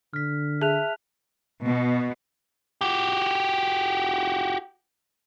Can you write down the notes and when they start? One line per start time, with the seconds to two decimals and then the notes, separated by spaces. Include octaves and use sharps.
0.13 D3 F6 B6
0.62 G#4 E5 A5 F#6 F7
1.65 B2
2.81 F#4 G4